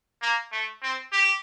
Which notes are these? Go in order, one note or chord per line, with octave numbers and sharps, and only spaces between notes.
A#3
A3
C4
G4